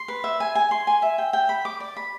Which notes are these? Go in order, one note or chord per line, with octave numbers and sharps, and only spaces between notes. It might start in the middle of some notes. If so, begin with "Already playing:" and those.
Already playing: C6
B4
E5
G#5
G#5
C6
G#5
E5
G5
G5
B5
D6
D5
B5